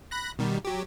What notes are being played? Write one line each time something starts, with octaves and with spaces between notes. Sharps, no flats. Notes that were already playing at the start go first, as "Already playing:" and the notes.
B5 F#6 A#6
B2 D#3 G3
F#3 G4